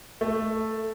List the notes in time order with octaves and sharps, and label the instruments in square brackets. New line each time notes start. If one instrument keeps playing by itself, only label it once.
[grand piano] A3